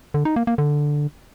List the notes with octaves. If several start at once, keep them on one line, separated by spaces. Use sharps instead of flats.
D3
D#4
A#3
A#3
D3